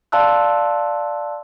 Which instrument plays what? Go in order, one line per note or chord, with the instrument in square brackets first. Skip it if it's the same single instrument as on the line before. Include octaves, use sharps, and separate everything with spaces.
[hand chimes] D5 F5 A5 C6 E6 F#6